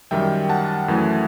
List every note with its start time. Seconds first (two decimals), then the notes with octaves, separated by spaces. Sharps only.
0.11 F#2 D#3 G3 E5 G5
0.49 F#5 A5
0.88 F#2 E3 A3